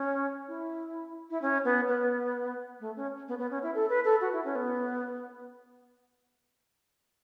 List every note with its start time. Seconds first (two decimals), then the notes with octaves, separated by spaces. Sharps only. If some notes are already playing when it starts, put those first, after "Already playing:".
Already playing: C#4
0.48 E4
1.30 E4
1.42 C#4
1.65 B3
1.88 B3
2.80 A3
2.96 C#4
3.28 B3
3.39 B3
3.50 C#4
3.63 E4
3.75 A4
3.89 B4
4.05 A4
4.21 F#4
4.33 E4
4.45 C#4
4.55 B3